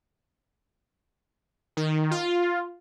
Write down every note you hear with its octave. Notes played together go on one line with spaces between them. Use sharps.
D#3
F4